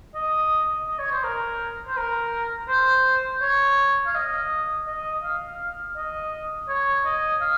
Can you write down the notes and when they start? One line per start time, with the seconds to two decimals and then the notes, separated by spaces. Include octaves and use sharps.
0.15 D#5
0.88 D#5
0.99 C#5
1.12 C5
1.24 A#4
1.87 C5
1.97 A#4
2.69 C5
3.42 C#5
4.07 F5
4.15 D#5
4.87 D#5
5.23 F5
5.96 D#5
6.69 C#5
7.05 D#5
7.41 F5